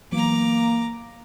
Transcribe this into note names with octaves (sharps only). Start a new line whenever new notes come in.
E3 F#3 A#3 B3 A#5 D6